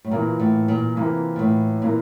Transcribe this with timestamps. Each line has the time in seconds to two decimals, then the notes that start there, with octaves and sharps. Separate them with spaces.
0.04 A2
0.11 A#2 E3 A#3 F4 A#4
0.40 A2
0.68 A#2
0.96 C3 E3 A#3 F4 A#4
1.36 A#2
1.39 A2
1.82 A#2 E3 A#3 F4 A#4